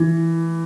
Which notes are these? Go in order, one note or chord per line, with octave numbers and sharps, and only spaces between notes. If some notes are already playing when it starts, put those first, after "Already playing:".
Already playing: E3